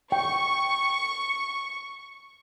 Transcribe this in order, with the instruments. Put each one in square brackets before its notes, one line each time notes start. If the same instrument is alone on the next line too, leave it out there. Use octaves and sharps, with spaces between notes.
[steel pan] G5 [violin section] C#6